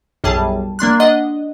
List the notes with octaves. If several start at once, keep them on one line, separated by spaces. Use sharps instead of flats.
B1 F#2 G3 G#4 A5
A#3 D4 C6 F#6
D4 D#5 F#5